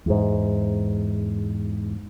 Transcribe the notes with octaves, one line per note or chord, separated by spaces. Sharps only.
E2 G#2